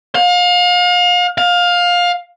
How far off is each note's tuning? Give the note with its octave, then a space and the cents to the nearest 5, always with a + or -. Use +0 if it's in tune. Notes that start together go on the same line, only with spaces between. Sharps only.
F5 +35
F5 +20